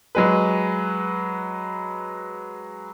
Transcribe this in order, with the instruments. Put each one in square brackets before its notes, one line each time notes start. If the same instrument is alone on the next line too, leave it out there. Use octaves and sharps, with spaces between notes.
[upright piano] F#3 G#3 B4